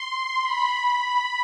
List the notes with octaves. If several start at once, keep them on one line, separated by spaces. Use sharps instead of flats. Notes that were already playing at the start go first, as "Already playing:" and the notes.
Already playing: C6
B5
B5